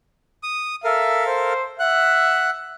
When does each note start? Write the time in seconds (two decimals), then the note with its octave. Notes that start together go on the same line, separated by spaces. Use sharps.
0.43 D#6
0.84 A4 A#4 E5 F5
1.27 C5
1.80 E5 F#5 F#6